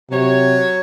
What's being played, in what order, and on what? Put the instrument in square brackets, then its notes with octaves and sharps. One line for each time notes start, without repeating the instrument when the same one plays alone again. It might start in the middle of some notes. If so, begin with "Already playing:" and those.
[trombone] C3 [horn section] F#3 C#5